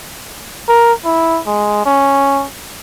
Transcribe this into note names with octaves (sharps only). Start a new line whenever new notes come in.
A#4
E4
G#3
C#4